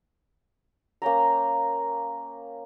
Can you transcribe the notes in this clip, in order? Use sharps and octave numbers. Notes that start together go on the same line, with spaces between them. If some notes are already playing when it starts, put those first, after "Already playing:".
A#3 C#4 G5 A#5